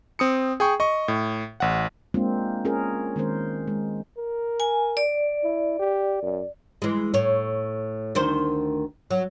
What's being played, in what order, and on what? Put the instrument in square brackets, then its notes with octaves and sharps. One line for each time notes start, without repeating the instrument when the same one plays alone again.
[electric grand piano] C4 D#6 C#7
G#4 G5 C#6
D#5 C#6
A2
A1 F#5
[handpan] G#3 A#3 C4 D4 F4
C#4 F4 G#4 A#4
D#3 G#3 C4 C#4 A#4 C5
G#3
[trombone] A#4
[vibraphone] G#5
D5
[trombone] E4
G4
F#2
[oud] E3 G#3
A2 C#5
D2 D#3 C5
F#3